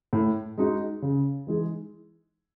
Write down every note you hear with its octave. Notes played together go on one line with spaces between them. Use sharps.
A2
G#3 D#4 F#4
C#3
E3 G#3 D#4 G#4